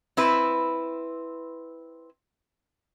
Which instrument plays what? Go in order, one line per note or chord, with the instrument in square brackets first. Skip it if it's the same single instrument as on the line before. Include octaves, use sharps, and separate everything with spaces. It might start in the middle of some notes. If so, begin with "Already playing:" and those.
[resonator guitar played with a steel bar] C4 E4 B4